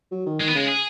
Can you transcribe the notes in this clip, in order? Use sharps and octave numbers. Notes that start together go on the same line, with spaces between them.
F#3
D#3
D#3 G#3
B3
C#3 G#3
G#4